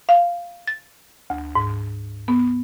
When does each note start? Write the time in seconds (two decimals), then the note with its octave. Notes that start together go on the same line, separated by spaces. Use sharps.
0.09 F5
0.67 A6
1.30 D2
1.55 G#2
2.28 B3